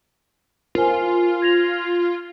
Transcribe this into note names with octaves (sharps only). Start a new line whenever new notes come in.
F4 A#4 C5 G#5
G#6 A#6 F7